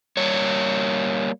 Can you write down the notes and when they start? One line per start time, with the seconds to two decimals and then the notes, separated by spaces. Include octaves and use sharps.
0.17 G3 A#3 C#5